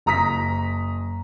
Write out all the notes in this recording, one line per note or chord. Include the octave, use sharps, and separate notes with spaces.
F#1 A#5 D#6 A#6 B6